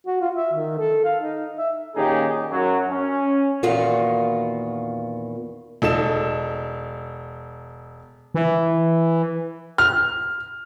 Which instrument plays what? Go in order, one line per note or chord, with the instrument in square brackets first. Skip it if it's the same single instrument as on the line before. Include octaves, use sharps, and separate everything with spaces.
[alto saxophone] F#4
F4
E5
D#3
A4
F5
D#4
E5
[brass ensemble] A#2 D#3 C#4 D#4 G4 G#4
F#2 F#3
C#4
[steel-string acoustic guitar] E2 A#2 D#3 B3 F4 F#4
[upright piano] E1 D#4 A4 E7
[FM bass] E3
[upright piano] F6